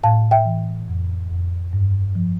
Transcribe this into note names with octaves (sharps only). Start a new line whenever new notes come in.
A2 F5 A5
E5 G5
E3
F2
F2
G2
F3